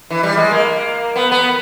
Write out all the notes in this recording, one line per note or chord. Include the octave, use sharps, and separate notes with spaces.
E3
G3
G#3
A#3
B3
B3